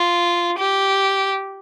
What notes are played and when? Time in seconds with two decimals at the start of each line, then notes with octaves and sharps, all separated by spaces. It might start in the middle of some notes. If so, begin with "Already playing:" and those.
Already playing: F4
0.58 G4